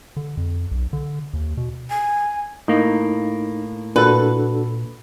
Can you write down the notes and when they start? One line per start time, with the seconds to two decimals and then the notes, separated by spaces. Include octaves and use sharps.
0.17 D3
0.37 F2
0.71 B1
0.93 D3
1.34 D#2
1.57 B2
1.90 G#5
2.68 A2 A#3 D#4
3.96 A#2 D4 F#4 A4 B4